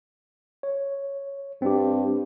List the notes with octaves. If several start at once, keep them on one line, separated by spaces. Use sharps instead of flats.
C#5
G2 C4 G4